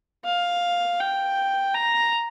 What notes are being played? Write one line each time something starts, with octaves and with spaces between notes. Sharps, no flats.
F5
G5
A#5